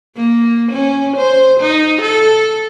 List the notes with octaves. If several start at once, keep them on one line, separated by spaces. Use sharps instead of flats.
A#3
C#4
C5
D#4
A4